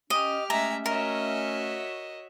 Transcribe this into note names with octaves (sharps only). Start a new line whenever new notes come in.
C#4 G4 D#5 F6
G#3 A3 C#4 E5 A#5
F#4 A#4 C#5 D#5 E5